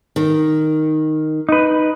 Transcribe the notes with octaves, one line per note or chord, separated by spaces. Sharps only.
D#3
D#4 B4